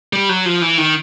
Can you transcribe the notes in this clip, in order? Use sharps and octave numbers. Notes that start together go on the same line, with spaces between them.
G3
F#3
F3
E3
D#3